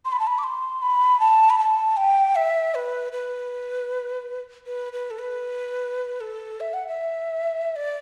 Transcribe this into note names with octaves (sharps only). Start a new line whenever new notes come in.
C6
B5
A5
B5
D6
C6
B5
A5
B5
A5
G5
E5
B4
B4
B4
B4
A4
B4
A4
E5
F#5
E5
D5